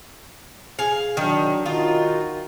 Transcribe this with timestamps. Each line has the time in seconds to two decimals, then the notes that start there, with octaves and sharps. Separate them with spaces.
0.79 G#4 F5
1.17 D#3 F#3 D4
1.66 D#3 D#4 F4 F#4